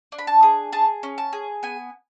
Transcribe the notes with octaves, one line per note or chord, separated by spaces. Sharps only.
D4
B5
A5
G#4
G#4 A5
C#4
A5
G#4
B3 G#5